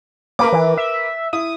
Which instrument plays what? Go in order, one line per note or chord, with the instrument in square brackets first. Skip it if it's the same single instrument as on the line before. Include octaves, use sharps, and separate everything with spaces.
[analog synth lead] A#3 [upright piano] A#4 B4 D6
[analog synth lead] E3
E5
[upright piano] E4 [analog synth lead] D#6